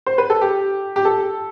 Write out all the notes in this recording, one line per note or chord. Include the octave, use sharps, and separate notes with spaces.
C5
B4
A4
G4
G4
A4